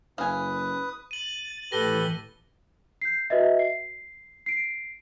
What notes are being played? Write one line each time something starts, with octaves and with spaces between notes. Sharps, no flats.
F#1 B4 F5 G#5 D#6
A6 D#7 F#7
A2 E3 G4 A4 B4 A#6 G7
G6 C7
F#4 B4 D#5 E5
C7
C7 D7